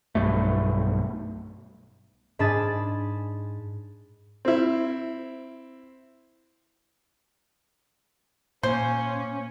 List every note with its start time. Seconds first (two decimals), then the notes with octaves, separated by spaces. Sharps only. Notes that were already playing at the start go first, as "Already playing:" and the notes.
0.15 B1 G2 A3
2.39 G#2 D4 G#4 A5 B5 A6
4.45 C4 E4
8.63 A#2 A#3 C#4 C5